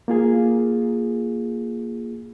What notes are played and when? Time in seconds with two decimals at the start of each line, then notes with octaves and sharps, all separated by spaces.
0.08 A#3 F4 G#4